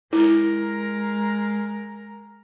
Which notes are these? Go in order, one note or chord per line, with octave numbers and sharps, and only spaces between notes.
G#3 E4 A#4